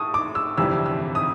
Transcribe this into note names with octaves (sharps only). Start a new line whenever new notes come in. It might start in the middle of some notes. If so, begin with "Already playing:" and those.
Already playing: A2 A5 C#6 D#6
D6
E6
G1 F2 C3 E3 G3 E6
E6
D#6